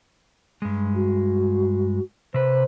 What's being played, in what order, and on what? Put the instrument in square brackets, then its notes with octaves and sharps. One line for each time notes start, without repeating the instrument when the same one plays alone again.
[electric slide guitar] G2 G#3
[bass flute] F#4
[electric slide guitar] C3 B4 [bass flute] C5